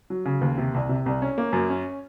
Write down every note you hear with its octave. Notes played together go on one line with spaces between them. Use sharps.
F#3
C#3
D#2
C3
C2
C3
C2
C#4
A#3
F#2
C#4